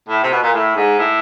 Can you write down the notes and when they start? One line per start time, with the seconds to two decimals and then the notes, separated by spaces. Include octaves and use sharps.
0.08 A2
0.23 C3
0.30 B2
0.42 A#2
0.53 A2
0.76 G#2
0.99 A2